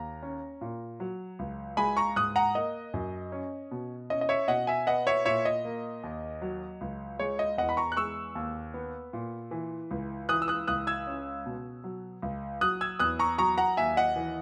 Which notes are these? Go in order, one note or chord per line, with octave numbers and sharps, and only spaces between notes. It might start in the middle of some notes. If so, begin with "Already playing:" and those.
Already playing: D#2 A#5
C#4
A#2
F#3
C#2
G#3 G#5 B5
A#5 C#6
G#2 D#6 F#6
F#5 A#5
A#3 D#5
F#2
C#4
B2
C#4 D#5
D#5
C#5 E5
B2 D#5 F#5
E5 G#5
B3 D#5 F#5
C#5 E5
A#2 C#5 E5
D#5
A#3
D#2
F#3
C#2
G#3 C#5
D#5
E2 D#5 F#5
B5
A#5 C#6
F#6
G#3 C#6 E6
D#2
B3
A#2
E3
C#2
E3 D#6 F#6
E6
D#6 F#6
C#2 D#6 F#6
E6 G#6
C#4
B2
F#3
C#2
F#3 D#6 F#6
E6 G#6
E2 D#6 F#6
A#5 C#6
F#3 A#5 C#6
F#5 A#5
D#2 E5 G#5
D#5 F#5
E3